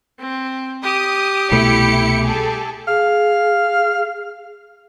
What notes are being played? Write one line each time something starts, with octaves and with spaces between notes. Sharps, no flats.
C4
G4 D#6
C2 B2 A3 E4 C#7
G#4 A4
G#4 F5